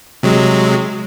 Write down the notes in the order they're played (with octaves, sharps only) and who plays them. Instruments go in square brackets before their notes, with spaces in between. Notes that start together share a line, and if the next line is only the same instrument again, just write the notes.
[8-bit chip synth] C3 F#3 G#3